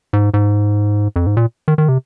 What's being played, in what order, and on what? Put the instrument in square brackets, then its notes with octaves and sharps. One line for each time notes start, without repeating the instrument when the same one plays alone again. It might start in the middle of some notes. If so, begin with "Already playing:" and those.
[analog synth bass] G#2
G#2
F2
G#2
A#2
D#3
D#3
C3